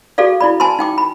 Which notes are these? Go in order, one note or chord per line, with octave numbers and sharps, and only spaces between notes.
F#4 G#4 A4 D5 F5
E4 D5 B5
G#5 A5 B5 C6
D#4 G5 D6
B5